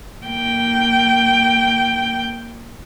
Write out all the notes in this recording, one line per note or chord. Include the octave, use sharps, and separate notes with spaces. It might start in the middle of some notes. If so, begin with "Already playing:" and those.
A#3 G5